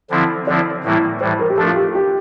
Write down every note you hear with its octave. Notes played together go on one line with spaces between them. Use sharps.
D3 F3 C4 E4
D3 F3 C4 E4 D5
A2 E3 G3 A#3 E4
A2 E3 G3 C5
A#4
G4
F3 A3 D4 A4
F4
G4
G4